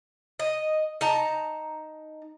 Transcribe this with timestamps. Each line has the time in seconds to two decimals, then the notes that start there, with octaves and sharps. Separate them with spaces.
0.39 D#5
1.01 D#4 A5 A#5